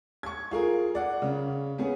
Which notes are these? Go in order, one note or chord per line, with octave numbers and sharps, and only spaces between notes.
C#6 G#6
F4 G#4 A#4
D5 F#5
C#3
B3 C#4 G#4